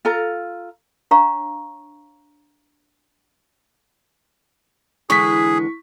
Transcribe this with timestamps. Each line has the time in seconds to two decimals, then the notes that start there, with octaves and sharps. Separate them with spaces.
0.05 F4 A4 A#5
1.11 D4 C#5 F5 A#5 C#6
5.10 D3 E3 G#3 G#4 C#6 B6